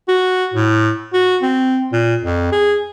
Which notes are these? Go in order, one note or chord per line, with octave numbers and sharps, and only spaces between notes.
F#4
A2
F#4
C4
A#2
F2
G#4